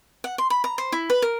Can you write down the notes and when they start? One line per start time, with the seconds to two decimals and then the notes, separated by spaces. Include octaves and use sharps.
0.24 F#5
0.38 C6
0.50 B5
0.64 A#5
0.78 C5
0.92 E4
1.10 B4
1.22 A#4